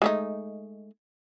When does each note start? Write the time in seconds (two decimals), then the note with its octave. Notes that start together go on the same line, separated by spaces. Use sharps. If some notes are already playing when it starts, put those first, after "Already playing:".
0.02 G#3 A3 D#4